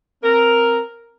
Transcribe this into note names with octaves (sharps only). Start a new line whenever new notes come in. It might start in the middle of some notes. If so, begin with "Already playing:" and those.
C4 A#4